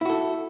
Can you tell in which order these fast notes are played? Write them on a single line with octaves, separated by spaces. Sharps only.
E4 F#4 A4